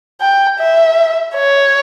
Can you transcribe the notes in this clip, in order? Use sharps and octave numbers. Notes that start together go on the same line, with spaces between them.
G5
E5
C#5